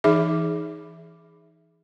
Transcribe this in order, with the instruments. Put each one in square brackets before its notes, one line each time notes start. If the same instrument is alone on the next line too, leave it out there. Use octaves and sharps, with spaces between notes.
[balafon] E3 D#4 G#4 E5 D6